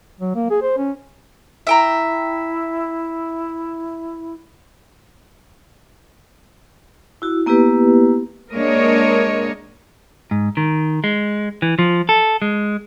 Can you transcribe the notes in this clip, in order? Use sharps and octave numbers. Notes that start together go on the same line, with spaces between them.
F#3
A#3
G#4
C5
C#4
E4 E5 G5 A#5
E4 F#4
A#3 B3 E4 G4 B4
G#3 A#3 D4 A#4 C#5 D#5
G#2
D#3
G#3
E3
F3
A4
G#3